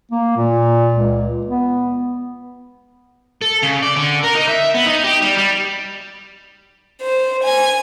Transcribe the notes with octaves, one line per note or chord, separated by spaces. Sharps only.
A#3
A#2
C#2
B3
A4
C#3
D5
D3
A#4
D#4
E5
B3
D#4
G4
G3
G3
C5
G#5